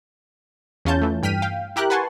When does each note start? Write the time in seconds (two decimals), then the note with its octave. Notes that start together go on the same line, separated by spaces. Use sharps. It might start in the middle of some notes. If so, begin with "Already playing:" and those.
0.85 E2 C#4 F4 A5 G6
1.02 E3 A3
1.23 G2 G5 F6 B6 D#7
1.42 F5 G5
1.76 E4 G4 A#4 F#6
1.90 B4 F#5 G#5 A5 C6 C#6